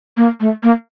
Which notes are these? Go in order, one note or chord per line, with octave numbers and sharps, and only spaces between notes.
A#3
A3
A#3